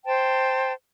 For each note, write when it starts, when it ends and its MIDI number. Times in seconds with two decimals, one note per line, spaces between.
0.05 0.73 72
0.05 0.73 79
0.05 0.73 81